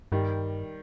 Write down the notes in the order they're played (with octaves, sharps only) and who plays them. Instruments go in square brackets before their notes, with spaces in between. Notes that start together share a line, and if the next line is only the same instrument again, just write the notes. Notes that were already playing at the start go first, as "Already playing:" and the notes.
[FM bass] G2 [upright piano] D#3 G3